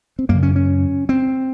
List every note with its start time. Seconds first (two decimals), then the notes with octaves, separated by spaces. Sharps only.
0.19 C4
0.29 F#2 A#3
0.34 C#3
0.43 C#4
0.56 C#4
1.09 C4